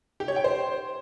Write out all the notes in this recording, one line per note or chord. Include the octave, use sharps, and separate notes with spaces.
G4
C#5
G5
C5